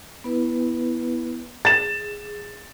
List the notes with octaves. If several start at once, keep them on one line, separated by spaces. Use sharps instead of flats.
B3 E4 B4
G#4 A6 E7